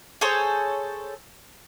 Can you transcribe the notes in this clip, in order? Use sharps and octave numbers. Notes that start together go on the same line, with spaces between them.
G#4 A4 C5 C#5